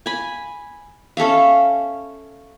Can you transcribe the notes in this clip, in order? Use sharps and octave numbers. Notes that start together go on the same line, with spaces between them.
G#5 B5
C#4 A4 E5 F5